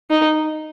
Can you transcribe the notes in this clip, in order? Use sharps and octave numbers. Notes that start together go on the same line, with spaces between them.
D#4